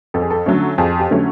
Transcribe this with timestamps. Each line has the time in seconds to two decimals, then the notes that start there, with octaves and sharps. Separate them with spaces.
0.14 F2 A4
0.22 G#4
0.30 A4
0.46 D3 F#3 A3 C#4
0.78 F2 G#4
1.00 G4
1.10 D3 F#3 A3 C#4